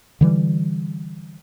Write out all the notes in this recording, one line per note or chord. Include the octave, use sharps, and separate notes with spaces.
D3 E3 G3